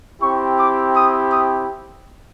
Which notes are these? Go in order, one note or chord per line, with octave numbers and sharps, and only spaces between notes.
C4 E4 G4 C#6
D6
D#6
D#6